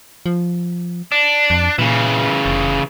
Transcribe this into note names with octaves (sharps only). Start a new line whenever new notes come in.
F3
D4
F2
A#2 C#3 E3
F1